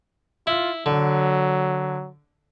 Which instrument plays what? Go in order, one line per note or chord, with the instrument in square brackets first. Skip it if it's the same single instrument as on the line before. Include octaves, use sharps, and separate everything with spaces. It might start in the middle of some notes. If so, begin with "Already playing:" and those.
[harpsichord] E4 [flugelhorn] F4
[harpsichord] D3 [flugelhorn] F#3